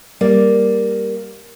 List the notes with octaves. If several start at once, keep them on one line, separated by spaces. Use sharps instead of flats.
G3 A#3 D5